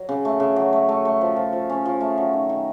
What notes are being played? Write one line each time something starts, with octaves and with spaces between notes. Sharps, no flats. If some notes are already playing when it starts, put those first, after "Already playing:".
Already playing: F#3
C#3
A3
C#3
F#3
A3
A3
A3
F3
F3
F3
C#4
F3
A3
F#3
D#3
D#3